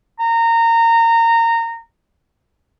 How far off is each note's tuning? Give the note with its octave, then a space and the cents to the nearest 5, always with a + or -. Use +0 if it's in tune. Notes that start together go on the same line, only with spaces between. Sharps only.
A#5 -20